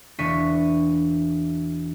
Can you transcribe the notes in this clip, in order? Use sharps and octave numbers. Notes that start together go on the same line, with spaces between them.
E1 E3 D4 C#6 B6 D#7